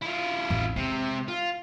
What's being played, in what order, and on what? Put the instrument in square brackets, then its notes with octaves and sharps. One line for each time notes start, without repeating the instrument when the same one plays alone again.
[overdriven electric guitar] E4 F4
[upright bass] A1 F2
[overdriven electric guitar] C3 [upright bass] G#3
[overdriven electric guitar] F4